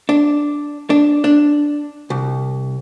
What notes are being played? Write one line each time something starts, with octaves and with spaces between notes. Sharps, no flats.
D4
D4
D4
C2